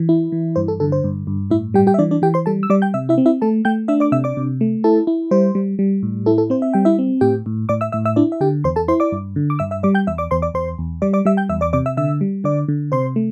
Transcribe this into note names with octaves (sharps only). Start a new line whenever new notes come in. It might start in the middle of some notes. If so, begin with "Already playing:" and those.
Already playing: E3
E4
E3
G2 C5
A4
D3 A4
C5
G2
G2
A2 E4 E5
G3 G4 G5
G4 G5
E5
E3 D4 D5
D4 D5
E3 G4 G5
C5 C6
G3 A4 A5
E6
G3 D5 D6
G5 G6
C3 E5 E6
E4 E5
C4
E4 E5
A3 A4 A5
A3 G5 G6
D4 E5 E6
D5 D6
C3 E5 E6
D5 D6
C3
A3
E4 A4 A5
E4
G3 C5
G3
G3
A2
E4 A4
A4
C4 C5
E5
G3 G5
E4 E5
C4
A2 G4 G5
A2
A2 D5 D6
E5 E6
A2 E5 E6
E5 E6
D4 E4 D5
E5
D3 G4 G5
E2 C5 C6
A4 A5
E4 C5 C6
D5 D6
G2
D3
D6
G2 E5 E6
E5 E6
G3 D5 D6
G5 G6
E2 E5 E6
D5 D6
E2 C5 C6
D5 D6
E2 C5 C6
E2
G3 D5 D6
D5 D6
G3 E5 E6
G5 G6
E2 E5 E6
D5 D6
C3 D5 D6
E5 E6
D3 E5 E6
G3
D3 D5 D6
D3
C3 C5 C6
A3